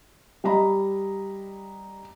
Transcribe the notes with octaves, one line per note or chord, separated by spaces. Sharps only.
G3 D#5 A#5 B5